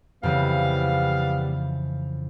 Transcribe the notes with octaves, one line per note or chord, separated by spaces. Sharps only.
F2 C#3 E3 G3 B3 F5